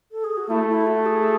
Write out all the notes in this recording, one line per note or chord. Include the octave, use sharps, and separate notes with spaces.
A4
G#4
F#4
A3 E4
E4
F#4
G#4